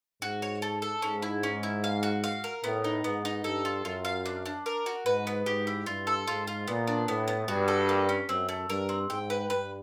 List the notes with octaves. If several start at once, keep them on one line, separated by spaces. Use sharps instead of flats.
G#2 F#4
C#5
A4
A4
G#2 C#4
E4
C#4
E4
F5
F#4
F5
A#4
A2 B3
D#4
G#2 B3
D#4
G2 A4
F4
F#2 F4
F5
D4
D4
A#4
F#4
G#2 B4
B3
G#2 G4
E4
G2 F4
A4
G#2 F4
F4
A#2 B3
D4
A2 B3
B3
G2 F#4
A4
A#3
C#4
F#2 C4
A3
G2 A#4
C4
G#2 G5
B4
G2 B4